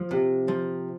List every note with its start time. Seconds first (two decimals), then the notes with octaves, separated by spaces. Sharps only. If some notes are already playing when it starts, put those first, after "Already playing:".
Already playing: F3
0.11 C3
0.48 F3